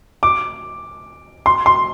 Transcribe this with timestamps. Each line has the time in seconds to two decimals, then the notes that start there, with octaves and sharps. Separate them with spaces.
0.23 D6
1.46 C6
1.66 C6